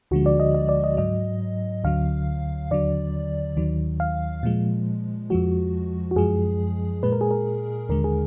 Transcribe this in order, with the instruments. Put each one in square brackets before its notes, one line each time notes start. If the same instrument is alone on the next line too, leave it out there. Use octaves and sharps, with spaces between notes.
[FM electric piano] D2 D3 F3 G#3 F#4
D5
D#5
D#5
D5
D#5
G#2 F#3 D#5
D2 D3 F#3 F5
D#2 D3 F#3 D5
D#2 D#3 F#3
F5
A#2 F3 G#3
F2 F3 G#3 F#4
F#4
F#2 F3 G#3 G#4
A#2 G#3 B4
A#4
G#4
A#4
D#2 D3 G#3 A#4
G#4